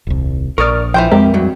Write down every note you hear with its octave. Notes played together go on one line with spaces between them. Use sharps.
D#1 C2
A#1 A#4 D5 C#6 D#6 F6
E3 F3 C5 G5
F2 G#3 C4 G4 A#4
G2 F#3